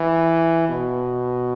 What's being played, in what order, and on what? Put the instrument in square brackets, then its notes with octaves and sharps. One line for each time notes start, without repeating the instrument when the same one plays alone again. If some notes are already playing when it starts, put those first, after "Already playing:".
Already playing: [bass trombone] E3
B2